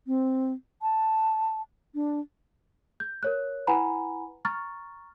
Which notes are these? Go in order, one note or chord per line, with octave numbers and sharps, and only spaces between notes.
C4
A5
D4
G6
A#4 C#5 F#6
E4 B4 F#5 G#5 A#5 B5
A#5 C#6 F6 A6